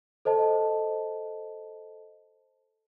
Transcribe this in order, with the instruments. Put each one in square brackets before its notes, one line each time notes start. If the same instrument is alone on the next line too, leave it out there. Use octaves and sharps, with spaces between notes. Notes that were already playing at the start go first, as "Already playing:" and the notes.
[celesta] A4 C5 D#5 A5